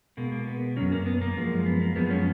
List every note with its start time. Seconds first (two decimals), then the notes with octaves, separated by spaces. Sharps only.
0.17 B2 G#3 A#3
0.32 A#3
0.47 B3
0.76 D#3 F#3 C#4
0.81 F#2
0.92 A#3
1.06 B3
1.22 A#3
1.36 F#2 F3 G#3
1.66 B3
1.81 A#3
1.96 F#2 F3 G#3 B3
2.10 C#4